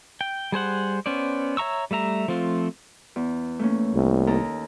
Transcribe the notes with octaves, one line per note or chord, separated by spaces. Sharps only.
G5
G3 G#4 C5 F#5
B3 C#4 C5 D5
C#5 E5 A#5 C#6 E6
G3 A3 E5 A#5
F3 A3 C4 F4
E2
A3 A#3 C#4
C2
D#2 A4 A#5